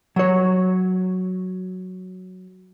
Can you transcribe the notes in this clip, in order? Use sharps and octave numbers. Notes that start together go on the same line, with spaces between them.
F#3 C#5